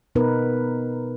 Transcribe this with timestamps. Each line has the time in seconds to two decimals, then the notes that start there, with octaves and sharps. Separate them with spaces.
0.15 B2 B3 D#4 A#4 B4